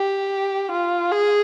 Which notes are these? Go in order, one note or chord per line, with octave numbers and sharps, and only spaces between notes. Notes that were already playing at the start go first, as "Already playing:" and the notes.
Already playing: G4
F4
G#4